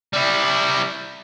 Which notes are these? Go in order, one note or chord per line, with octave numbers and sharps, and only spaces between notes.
G3 E4